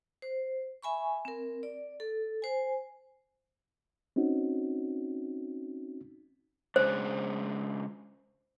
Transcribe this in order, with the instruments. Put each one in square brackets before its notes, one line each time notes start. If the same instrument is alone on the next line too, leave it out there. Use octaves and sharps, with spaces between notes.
[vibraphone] C5
E5 G#5 B5 C#6
C4 A#4
D5
A4
C5 G#5
[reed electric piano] C4 C#4 D#4 F#4
[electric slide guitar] C#3 G#3 D4 [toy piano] C5